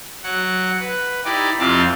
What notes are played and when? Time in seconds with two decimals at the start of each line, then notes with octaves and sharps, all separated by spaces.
0.23 F#3 F#5
0.80 B4
1.25 D#4 E4 G4 D5
1.59 F2 C3 C4 F4 D5 A5